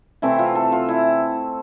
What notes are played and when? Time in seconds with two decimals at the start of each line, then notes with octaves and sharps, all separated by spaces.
0.22 C3 E3 A3 C4 E4
0.39 F4
0.55 A4
0.72 F4
0.89 E4